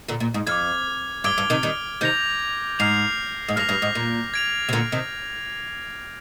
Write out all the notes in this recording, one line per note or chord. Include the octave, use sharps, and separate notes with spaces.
A#2 D3
A#2
G#2
F2 D6 F6 G#6
G2 D6 G#6 D7 G7
G2
C3 D#3
D#3 G3
C3 D#3 G6 A#6 F7
G#2 F6 C7 F7
G#2
G2 F6 A#6 F7
G2
G#2
A#2
G#6 D7 F7
C3
A#2 D3
C3 D#3